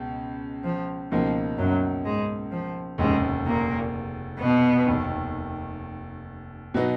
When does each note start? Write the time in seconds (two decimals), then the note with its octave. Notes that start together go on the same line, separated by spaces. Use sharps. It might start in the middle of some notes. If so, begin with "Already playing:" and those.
Already playing: C#2 B2 G#3 C#4
0.64 F3
1.11 C#2 B2 F3 A#3 D#4
1.58 F#2 F#3
2.05 G#2 G#3
2.51 F3
2.98 F1 D#2 G#2 C#3 G#3
3.45 A#2 A#3
4.39 B2 B3
4.86 F1 D#2 D#3
6.74 B2 F#3 B3 D#4